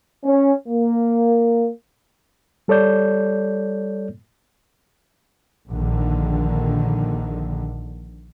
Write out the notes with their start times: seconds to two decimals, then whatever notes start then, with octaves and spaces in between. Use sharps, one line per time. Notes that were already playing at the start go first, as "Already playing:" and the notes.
0.25 C#4
0.68 A#3
2.68 G3 A4 C#5 D5 G6
5.68 A#1 D3 D#3